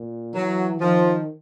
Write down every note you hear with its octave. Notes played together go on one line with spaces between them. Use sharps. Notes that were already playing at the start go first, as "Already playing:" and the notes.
Already playing: A#2
E3 F#3
D#3 F3